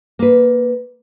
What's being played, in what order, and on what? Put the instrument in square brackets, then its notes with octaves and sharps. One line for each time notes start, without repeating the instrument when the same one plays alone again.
[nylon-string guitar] A#3 B4